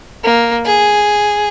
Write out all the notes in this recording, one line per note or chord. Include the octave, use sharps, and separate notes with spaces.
A#3
G#4